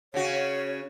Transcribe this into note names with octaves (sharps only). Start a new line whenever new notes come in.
C#3 C#4 F#4 C#5